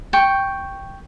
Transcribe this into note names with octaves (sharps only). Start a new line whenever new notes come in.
G5 C#6